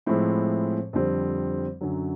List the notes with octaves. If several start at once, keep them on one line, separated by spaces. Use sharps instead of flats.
A2 F3 G#3 C4 E4
F2 D3 G3 C4
F#2 D3 F#3